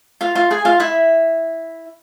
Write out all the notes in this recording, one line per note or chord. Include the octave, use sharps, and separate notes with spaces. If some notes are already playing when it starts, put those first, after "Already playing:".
F4 F5
F4 F5
G#4 G#5
F4 F5
E4 E5